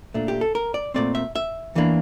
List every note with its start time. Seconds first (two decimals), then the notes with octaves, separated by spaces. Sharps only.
0.14 A#2 A3 D4
0.28 G4
0.41 A4
0.55 A#4
0.74 D5
0.94 A#2 A3 C4 D5
1.15 E5
1.36 E5
1.75 E2 E3 A#3 D4